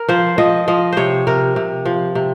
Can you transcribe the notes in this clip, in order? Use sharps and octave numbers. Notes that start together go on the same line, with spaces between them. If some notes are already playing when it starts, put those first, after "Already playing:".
Already playing: A#4
F3 C5
F3 D#5
F3 D#5
C3 C5 C#5
C3 A#4
C3
F3
C3